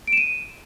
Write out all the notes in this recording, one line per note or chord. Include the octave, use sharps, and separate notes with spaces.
D7
E7
D#7